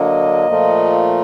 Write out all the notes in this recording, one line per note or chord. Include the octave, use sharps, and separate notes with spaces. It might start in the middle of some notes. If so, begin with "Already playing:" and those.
Already playing: D3 F#3 A#3 D4 D#5
A#2 F3 A3